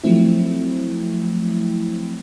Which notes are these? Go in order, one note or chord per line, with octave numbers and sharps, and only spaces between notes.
F3 F#3 A3 C4 E4